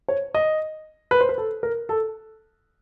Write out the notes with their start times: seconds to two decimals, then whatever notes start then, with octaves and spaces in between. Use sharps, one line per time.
0.08 C#5
0.35 D#5
1.11 B4
1.21 C5
1.29 B4
1.38 A4
1.63 A#4
1.89 A4